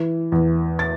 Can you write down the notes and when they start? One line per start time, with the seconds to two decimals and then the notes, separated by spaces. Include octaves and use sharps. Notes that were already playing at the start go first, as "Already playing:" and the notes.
Already playing: E3
0.32 E2
0.79 A6